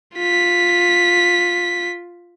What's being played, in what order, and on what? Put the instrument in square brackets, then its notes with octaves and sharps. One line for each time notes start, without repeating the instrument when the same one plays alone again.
[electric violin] F4 B6